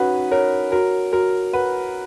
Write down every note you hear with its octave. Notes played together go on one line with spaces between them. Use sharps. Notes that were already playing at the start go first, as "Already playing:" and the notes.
Already playing: C#4 D#4 F#4 B4 F#5
A#4 C#5
F#4 A#4
F#4 A#4
B4 F#5